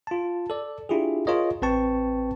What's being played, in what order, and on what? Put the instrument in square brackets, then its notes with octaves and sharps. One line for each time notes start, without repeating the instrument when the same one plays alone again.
[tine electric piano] F4 A5
A4 D5
D4 E4 F4 G4 G#4
F4 G#4 A#4 C#5 D#5
A1 C4 B4 G5 A5 C#6